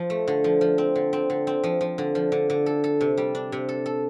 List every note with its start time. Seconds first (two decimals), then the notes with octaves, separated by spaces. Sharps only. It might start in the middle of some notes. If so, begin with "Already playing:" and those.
Already playing: F3
0.10 A3
0.28 D3
0.44 F3
0.61 F3
0.78 C4
0.96 D3
1.13 C4
1.30 D3
1.47 C4
1.64 F3
1.81 F3
1.98 D3
2.15 F3
2.32 D3
2.50 D3
2.66 A4
2.84 A4
3.01 C3
3.18 G3
3.35 D4
3.52 C3
3.69 A4
3.86 A4